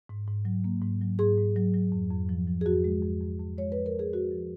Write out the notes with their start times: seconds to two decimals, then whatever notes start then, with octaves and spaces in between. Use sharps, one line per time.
0.09 G#2
0.27 G#2
0.45 F#3
0.64 A#3
0.82 G#2
1.01 F#3
1.19 G#2 G#4
1.38 G#2
1.56 F#3
1.74 F#3
1.92 F2
2.11 F2
2.29 F3
2.47 F3
2.61 G#4
2.66 F2 F#4
2.84 G#3
3.03 F2
3.21 F2
3.40 F2
3.58 G#3 C#5
3.72 F3 B4
3.86 A#4
3.95 F2 G#4
4.13 G#3 F#4
4.31 F3